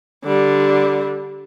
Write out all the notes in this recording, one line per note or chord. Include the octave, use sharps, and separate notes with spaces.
D3 G3